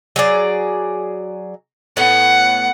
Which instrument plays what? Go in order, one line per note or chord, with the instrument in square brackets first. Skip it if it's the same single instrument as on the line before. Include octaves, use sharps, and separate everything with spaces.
[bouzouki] F#3 G#4 D5
[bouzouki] A2 B3 [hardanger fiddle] F#5